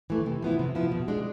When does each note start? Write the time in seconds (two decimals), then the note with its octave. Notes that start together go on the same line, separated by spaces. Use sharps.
0.10 E3 A3
0.26 C3
0.42 F3 B3 E4
0.59 C3
0.75 F3 B3 E4
0.91 B2
1.08 G#3 D4